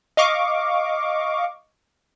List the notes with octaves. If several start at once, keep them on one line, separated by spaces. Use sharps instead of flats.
D#5 F5 C#6 D6